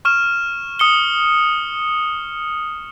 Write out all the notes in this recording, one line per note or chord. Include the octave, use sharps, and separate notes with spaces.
C#6 F6 E7
D#6 C#7 G7